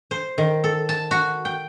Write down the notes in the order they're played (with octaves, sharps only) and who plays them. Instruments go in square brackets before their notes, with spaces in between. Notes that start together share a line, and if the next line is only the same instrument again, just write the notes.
[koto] C5
D#3
A4
A5
F#4
G5